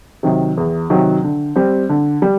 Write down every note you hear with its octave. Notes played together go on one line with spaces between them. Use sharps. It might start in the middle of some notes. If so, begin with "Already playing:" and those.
C3 D#3 F#3
E2
C3 D#3 F#3
D3
G3 C4
D3
G3